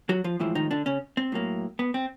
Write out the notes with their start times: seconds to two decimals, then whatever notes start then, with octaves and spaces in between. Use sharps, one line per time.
0.09 F#3 F#4
0.24 F3 F4
0.39 A2 E3 F3 G#3 E4
0.55 D#3 D#4
0.71 D3 D4
0.86 C#3 C#4
1.17 C4
1.32 A2 F#3 A#3
1.79 B3
1.94 C4